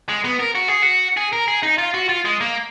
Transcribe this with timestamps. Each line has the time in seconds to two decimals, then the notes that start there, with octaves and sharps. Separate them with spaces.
0.09 G#3
0.25 B3
0.40 A#4
0.55 F#4
0.68 G#4
0.83 F#4
1.17 G#4
1.33 A#4
1.48 G#4
1.63 D#4
1.78 F4
1.94 F#4
2.09 F4
2.25 G#3
2.41 A#3